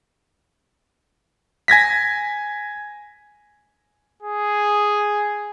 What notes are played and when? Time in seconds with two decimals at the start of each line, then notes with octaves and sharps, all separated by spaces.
1.68 G#5 G#6 A#6 B6
4.22 G#4